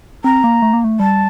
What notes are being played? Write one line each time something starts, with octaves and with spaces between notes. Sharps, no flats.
C4 A#5
A#3
A3
A#3
A3
G3 A5